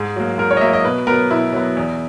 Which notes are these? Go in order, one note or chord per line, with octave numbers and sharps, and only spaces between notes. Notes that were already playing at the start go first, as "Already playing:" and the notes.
Already playing: G#2 G#4
F#3 A#3
G#2 A#4
C#5
D#5
F#3 A#3 E5
D#5
B2 B4
F#3 B3 A#4
B2 E4
F#3 B3
E2